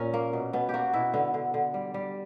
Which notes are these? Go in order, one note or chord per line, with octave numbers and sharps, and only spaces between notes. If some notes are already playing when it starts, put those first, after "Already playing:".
Already playing: A#2 C#4 A#4
A#3
B2
B2 B3
A#3 F#4 G4
B2 E4
D3 B3
D3
D3
G3
G3